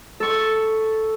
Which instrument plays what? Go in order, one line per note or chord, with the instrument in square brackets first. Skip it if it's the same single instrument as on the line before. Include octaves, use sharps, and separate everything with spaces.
[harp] A4 C#6